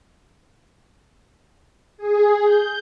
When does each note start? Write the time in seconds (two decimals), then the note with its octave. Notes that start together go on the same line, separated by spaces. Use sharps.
1.98 G#4
2.45 G6